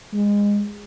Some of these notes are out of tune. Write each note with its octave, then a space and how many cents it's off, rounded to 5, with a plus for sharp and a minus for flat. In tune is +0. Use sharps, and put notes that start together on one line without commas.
G#3 -25